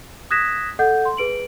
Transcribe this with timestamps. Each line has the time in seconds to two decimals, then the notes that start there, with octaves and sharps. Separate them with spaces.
0.31 D#6 F#6 G#6 A#6 B6 E7
0.79 A4 D#5 F#5 G6
1.05 C6
1.17 G#4 B4 D7 F#7